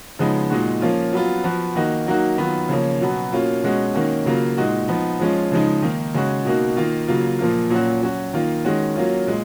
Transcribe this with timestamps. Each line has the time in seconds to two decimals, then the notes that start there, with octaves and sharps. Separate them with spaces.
0.19 C#3 F3 G#3 B3 D#4
0.50 A#2 G#3 D#4 F#4
0.82 F3 A#3 C#4 F4
1.13 F#3 B3 F4
1.44 F3 B3 F#4
1.75 D#3 A#3 D#4 F#4
2.07 F#3 A#3 D#4 F#4
2.38 D#3 F#3 B3 F4
2.69 C#3 F3 A#3 C#4
3.01 B2 F#3 B3
3.32 B2 A#3 C#4 F4
3.63 B2 G#3 C#4 F#4
3.95 D#3 A#3 C#4 F#4
4.26 C#3 F#3 A#3 F4
4.58 A#2 G#3 D#4 F#4
4.88 F3 B3 D#4
5.20 F3 G#3 C#4 F4
5.51 C#3 F3 G#3 D#4
5.82 D#3 A#3 D#4
6.14 C#3 G#3 C#4 F#4
6.45 B2 A#3 D#4 F#4
6.77 D#3 A#3 F4
7.08 C#3 F#3 A#3 F4
7.39 A#2 F3 A#3 F4
7.70 A#2 F#3 C#4 F#4
8.02 F#3 C#4 F#4
8.33 D#3 A#3 F4
8.65 D#3 G#3 C#4 F#4
8.96 F#3 A#3 C#4 F4
9.27 A#2 G#3